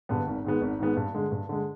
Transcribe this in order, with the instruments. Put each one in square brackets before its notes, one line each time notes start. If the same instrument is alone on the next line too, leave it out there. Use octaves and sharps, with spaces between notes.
[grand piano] G2 D3 G3 B3
G#1
G#2 D#3 G#3 B3
G#1
G#2 D#3 G#3 B3
G2
D3 G#3
G2
D3 G#3